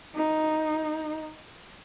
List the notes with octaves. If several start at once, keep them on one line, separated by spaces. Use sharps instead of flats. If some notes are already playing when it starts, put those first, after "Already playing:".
D#4